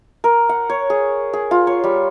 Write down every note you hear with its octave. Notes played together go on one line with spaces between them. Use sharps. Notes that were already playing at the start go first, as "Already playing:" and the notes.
A#4
F#5
C#5
G#4
G#4
F4
C#5
G3